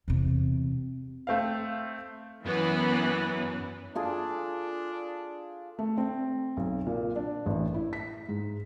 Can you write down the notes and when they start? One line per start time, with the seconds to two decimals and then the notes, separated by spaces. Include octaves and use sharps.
0.08 E2 C3
1.27 A3 C4 F5
2.46 F#2 E3 B3
3.95 D4 F4 G#4 A4
5.79 A3
5.98 C4
6.57 B1
6.87 A#2
7.16 D4
7.46 A1
7.74 E4
7.93 B6
8.28 G#2